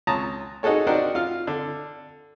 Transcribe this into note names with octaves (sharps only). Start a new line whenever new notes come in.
C#2 C#5 A5 A#5 D#6
D#4 F#4 G#4 A4 C#5
D4 D#4 F#4 G4 A#4 C5
F4 F6
D3